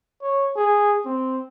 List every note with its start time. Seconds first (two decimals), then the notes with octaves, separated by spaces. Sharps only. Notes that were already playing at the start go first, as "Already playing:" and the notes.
0.22 C#5
0.56 G#4
1.05 C4